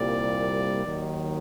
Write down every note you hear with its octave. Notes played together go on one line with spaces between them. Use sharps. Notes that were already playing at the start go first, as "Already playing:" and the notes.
Already playing: C2 A#2 G3 A#3 D5
D#2 D#3 F#3